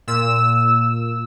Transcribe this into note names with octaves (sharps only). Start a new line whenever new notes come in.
A#2 E6